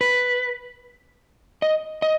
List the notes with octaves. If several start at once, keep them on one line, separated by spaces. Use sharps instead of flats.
B4
D#5
D#5